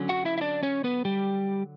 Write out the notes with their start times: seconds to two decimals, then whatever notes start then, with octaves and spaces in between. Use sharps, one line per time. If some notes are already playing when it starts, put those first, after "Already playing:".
Already playing: D3 F#3 C#4
0.09 F#4 F#5
0.25 E4 E5
0.38 E5
0.41 D4 D5
0.63 C#4 C#5
0.84 B3 B4
1.05 G3 G4